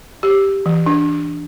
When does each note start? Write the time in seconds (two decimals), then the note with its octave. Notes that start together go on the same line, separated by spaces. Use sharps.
0.23 G4
0.66 E3
0.86 D4